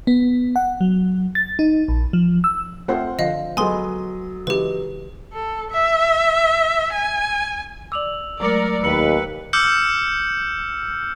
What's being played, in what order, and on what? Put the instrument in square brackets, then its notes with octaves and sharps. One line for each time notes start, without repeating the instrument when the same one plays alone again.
[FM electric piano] B3
F#5
F#3
A6
D#4
A#1
F3
E6
[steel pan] A3 C4 F4 [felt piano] C5 F#5
[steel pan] D3 F3 [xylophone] D#5 F5
[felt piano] F#3 A4 D#6 [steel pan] G#3 B3 [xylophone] G#5 C6
[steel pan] C#3 E3 G#3 [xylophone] G4 B4
[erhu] A4
E5
G#5
[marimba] D5 D6 [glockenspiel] E6 F7 F#7
[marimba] F#3 G#3 A3 [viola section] A#4 D5 [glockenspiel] A#5 C#7
[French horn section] D#2 [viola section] B4 [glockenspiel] E6 C#7 F#7
[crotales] D6 E6 F6 G6 C#7